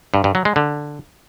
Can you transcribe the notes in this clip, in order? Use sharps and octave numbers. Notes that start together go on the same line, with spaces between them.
G2
G2
F#3
G#3
D3